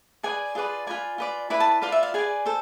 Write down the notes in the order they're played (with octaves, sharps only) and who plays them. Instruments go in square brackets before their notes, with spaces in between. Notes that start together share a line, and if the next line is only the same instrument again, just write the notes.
[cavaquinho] G#4 B4 D5 G#5
F4 G#4 B4 D5
F4 B4 D5 G#5
F4 B4 D5
E4 B4 D5 B5
A5
F4 B4 D5 F5
E5
F5
G#4 B4 D5 G#5
A4 C5